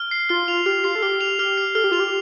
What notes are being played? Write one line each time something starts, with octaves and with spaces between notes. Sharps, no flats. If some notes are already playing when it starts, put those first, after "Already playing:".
Already playing: F6
C7
F4 F6
F4 F7
G4 F6
F4 C7
A4
G4 F6
F7
G4 F6
C7
A4 F6
G4
F4 F7
G4